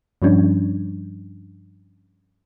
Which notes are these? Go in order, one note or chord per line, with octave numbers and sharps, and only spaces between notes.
G2 F3 G3 C#4 D4